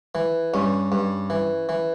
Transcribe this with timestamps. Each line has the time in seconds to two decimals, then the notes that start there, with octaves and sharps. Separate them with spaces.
0.15 E3
0.54 G2 C#4
0.92 G2
1.30 E3
1.69 E3